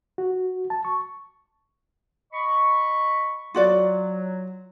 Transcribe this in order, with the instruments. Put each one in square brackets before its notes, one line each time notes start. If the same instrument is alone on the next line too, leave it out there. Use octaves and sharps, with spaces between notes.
[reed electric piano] F#4
A5
C#6
[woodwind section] D#5 B5 C#6
[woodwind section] F#3 [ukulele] F4 F#4 D5